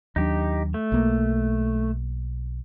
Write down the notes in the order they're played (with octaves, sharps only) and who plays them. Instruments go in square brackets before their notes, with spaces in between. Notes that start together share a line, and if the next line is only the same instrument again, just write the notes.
[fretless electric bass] D#2 F#3 D4 [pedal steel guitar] D#4 G4
[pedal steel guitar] A3
[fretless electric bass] B1 A#3